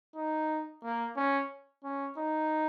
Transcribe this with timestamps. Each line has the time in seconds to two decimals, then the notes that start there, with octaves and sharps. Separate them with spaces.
0.16 D#4
0.83 A#3
1.17 C#4
1.84 C#4
2.18 D#4